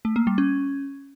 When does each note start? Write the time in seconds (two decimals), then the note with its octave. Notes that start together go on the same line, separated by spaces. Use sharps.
0.05 A3
0.16 A#3
0.27 G3
0.38 C#4